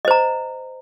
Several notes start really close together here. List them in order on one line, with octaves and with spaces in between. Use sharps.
D#5 C5 A#5